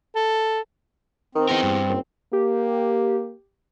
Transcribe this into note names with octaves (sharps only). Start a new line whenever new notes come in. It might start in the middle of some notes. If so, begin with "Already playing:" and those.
A4
D#3 C4
E2 D#4 A#4
G2
F#1
A#3 G4